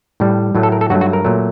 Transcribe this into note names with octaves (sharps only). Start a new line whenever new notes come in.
A2 G3
A2 F#3 A3
A4
A#4
A4
G2 F#3 A3 F#4
F#4
A#4
A#2 F#3 A3